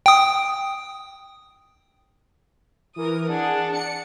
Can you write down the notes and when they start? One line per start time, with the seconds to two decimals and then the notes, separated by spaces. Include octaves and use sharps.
0.06 G5 D#6
2.96 E3 A#4 D#6
3.29 D4 G#4 F#5
3.72 C#7